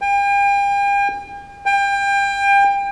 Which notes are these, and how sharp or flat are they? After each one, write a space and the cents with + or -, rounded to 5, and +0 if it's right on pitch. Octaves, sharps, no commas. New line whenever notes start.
G5 +40
G5 +30